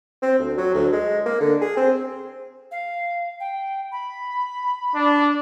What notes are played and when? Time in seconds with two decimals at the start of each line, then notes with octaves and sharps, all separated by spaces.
0.22 C4
0.39 D2
0.57 F#3
0.74 D2
0.93 G#3
1.26 A#3
1.40 D3
1.61 G#4
1.77 C4
2.71 F5
3.40 G5
3.92 B5
4.95 D4